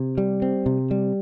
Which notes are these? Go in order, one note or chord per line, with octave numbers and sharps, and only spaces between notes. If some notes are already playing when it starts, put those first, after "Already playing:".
Already playing: C3
G3
C4
C3
G3